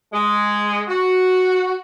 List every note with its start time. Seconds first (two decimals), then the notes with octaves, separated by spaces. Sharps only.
0.13 G#3
0.89 F#4